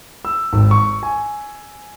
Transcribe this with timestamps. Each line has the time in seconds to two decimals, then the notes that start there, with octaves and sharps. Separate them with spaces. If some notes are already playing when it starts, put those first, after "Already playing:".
0.25 E6
0.53 G#1
0.71 C#6
1.03 G#5